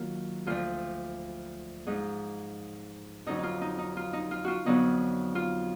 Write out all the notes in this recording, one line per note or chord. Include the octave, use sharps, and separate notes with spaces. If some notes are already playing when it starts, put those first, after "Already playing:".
Already playing: D#3 F#3 A#3 F4
D2 D3 F3 F4
G#2 F3 G#3 D#4
F2 D3 F#3 D#4
D#4 F4
D#4
D#4
F4
D#4
F4
F4 F#4
F2 D3 F#3 B3 D#4
F4